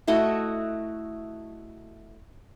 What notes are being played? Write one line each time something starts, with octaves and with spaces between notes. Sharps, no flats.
A3 E4 F#4 D#5